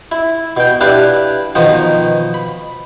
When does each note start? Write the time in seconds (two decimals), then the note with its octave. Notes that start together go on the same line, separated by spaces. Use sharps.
0.12 E4
0.57 B2 G5
0.81 D4 E4 G4 B4 F5
1.55 B2 D#3 F3 D#4
2.34 B5